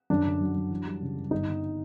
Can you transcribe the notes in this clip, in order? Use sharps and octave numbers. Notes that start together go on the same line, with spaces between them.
F#2 D4
D3
F#3
F#3
E3
G3
C#3
G3
G1 D#4
G1